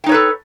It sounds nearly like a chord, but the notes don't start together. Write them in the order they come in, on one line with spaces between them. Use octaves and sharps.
G5 D#4 C#5 B4 A4